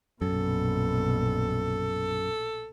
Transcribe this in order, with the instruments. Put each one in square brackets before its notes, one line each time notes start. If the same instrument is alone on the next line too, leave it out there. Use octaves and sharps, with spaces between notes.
[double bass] A#1 B2 [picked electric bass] F#2 [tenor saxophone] A4